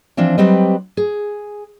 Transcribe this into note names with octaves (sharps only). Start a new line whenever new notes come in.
E3 F3 C4 D4
F#3 G3 C4 G4 B4 D#5
G#4